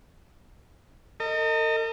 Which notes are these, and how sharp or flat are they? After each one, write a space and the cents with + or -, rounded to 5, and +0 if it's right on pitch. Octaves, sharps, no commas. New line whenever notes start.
A#4 -45 D#5 +0